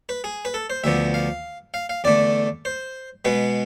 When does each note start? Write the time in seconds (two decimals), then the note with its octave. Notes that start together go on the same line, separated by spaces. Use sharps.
0.09 B4
0.24 G#4
0.45 B4
0.54 A4
0.70 C5
0.84 D2 D3 F3 B3 E5
1.14 F5
1.74 F5
1.89 F5
2.04 E2 D3 A3 D5
2.65 C5
3.25 B2 G#3 B3 B4